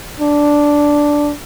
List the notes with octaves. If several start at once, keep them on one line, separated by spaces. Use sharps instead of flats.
D4